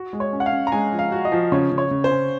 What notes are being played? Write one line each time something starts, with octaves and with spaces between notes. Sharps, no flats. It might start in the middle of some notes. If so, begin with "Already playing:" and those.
Already playing: F#4
G#3
C#5
C#4
F#5
F5
C#4
A#5
G#3 G#5
F3
F5
F#4
D#5
F3
C#3 C#5
C#3
C#5
C#3
C5
C#4